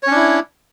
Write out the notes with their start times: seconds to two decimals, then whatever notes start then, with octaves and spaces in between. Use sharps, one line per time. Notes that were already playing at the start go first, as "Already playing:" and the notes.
0.03 C#5
0.07 C#4
0.11 D4
0.15 E4